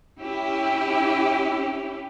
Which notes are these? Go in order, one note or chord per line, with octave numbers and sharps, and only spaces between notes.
C#4 E4 G4